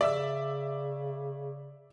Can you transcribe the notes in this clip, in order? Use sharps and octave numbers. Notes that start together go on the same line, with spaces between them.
C#3 D5 E5 E6